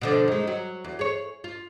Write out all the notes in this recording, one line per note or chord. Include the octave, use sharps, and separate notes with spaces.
B2 D3 F3
D#3 G#3
F#3
E2
G#4 C#5
F4